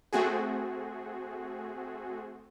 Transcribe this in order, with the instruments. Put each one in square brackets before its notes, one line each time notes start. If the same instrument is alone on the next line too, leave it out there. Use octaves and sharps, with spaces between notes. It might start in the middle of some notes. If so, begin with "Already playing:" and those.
[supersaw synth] A3 C4 F#4 G#4